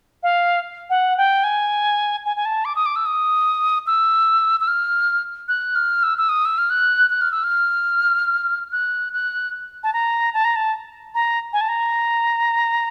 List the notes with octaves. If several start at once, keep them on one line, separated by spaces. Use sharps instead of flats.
F5
F#5
G5
G#5
G#5
G#5
A5
D6
D#6
D6
E6
D#6
E6
E6
F6
F#6
F6
E6
E6
D#6
E6
F6
F#6
F#6
F6
E6
F6
F#6
F#6
A5
A#5
A5
A#5
A5
A#5
G#5
A5
A#5